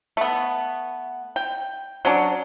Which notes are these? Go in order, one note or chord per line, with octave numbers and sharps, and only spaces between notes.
A3 B3
G5
F#3 C#4 D4